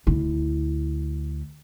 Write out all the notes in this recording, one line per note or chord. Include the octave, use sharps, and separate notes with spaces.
D2 E4